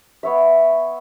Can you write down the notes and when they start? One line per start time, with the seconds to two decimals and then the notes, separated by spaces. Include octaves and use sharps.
0.23 B3 C#5 E5